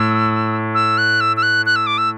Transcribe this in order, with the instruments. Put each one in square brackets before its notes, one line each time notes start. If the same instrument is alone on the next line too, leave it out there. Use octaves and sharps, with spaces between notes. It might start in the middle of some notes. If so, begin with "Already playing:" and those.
Already playing: [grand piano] A2 [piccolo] E6
[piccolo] E6
F#6
E6
E6
F#6
F#6
E6
D6
E6